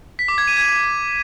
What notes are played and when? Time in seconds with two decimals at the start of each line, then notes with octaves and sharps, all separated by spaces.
0.19 B6
0.28 D6
0.38 G#6
0.47 D#7
0.57 G#6